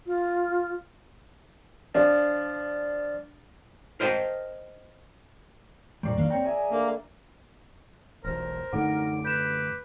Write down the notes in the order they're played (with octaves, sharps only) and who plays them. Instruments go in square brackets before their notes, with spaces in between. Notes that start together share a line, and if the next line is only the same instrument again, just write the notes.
[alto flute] F4
[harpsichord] F3 [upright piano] D4
[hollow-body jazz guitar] A#4 C5 D#5 G5 A5
[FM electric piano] F2 D3 C7 [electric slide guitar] A#2 G3 [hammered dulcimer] A#4 D5 C#6
[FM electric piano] B1 F#2 A#3 [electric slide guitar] D#3 D4 F5
[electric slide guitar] C4 C#5 G5 [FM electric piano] A#5
[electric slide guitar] G#4 [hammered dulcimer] E5 G#5
[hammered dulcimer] D3 [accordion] A#3
[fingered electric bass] E1 B1 [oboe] A#4 [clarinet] C5
[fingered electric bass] F#2 D3 A3 [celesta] D#4 F#5 [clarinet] D6
[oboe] B4 [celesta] G6 E7